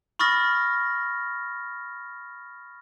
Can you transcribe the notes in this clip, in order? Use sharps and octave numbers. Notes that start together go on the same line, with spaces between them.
B5 C#6 D#6 F6 A6 A#6